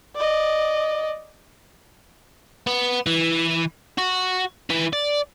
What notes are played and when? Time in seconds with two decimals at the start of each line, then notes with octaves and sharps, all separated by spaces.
0.16 D5 D#5
2.67 B3
3.06 E3
3.98 F#4
4.70 E3 B4
4.93 D5